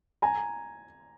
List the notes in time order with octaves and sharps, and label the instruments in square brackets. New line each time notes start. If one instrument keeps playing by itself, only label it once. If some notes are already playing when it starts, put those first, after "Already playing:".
[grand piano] G#5 A#5